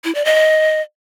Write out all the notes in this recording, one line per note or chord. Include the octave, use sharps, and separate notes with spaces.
E4
D5
D#5